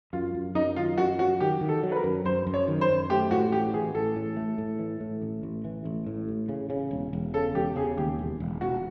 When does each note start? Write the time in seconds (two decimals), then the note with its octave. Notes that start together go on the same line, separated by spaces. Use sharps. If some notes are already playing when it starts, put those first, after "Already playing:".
0.13 F#2 F4
0.35 F#2
0.55 F#2 D#4
0.76 D#3 F4
0.97 F#2 F#4
1.19 F#3 F#4
1.40 D#3 G4
1.61 D#3
1.69 A4
1.83 F#3
1.92 B4
1.96 A#4
2.04 F#2
2.25 F#2 C5
2.47 F#2
2.54 C#5
2.68 D#3
2.81 C5
2.89 F#2
3.10 A3 G4
3.31 A2 F#4
3.52 A1 G4
3.74 E3 G#4
3.95 A1 A4
4.16 A2
4.37 A3
4.58 A2
4.79 E3
5.00 A2
5.22 A1
5.43 A1
5.65 E3
5.85 A1
6.06 A2
6.28 A1
6.49 C#3
6.70 C#3
6.91 E1
7.13 E1
7.34 C#3 A4
7.55 E1 G4
7.76 C#3 G#4
7.97 D#2 G4
8.19 E1
8.40 E1
8.61 E1 F#4